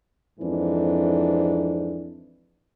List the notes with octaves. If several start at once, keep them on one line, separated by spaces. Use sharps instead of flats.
F2 G#2 E3 D4